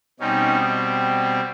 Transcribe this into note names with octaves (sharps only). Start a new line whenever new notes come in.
B2 G3 C4 C#4 D#4